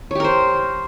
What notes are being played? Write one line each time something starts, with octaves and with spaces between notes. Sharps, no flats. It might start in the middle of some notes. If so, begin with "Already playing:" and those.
G4 A#4 C5 C#5